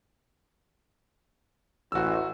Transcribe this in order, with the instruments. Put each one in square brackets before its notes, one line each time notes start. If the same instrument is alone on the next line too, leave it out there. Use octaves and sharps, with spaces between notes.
[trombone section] A1 [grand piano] F#4 E6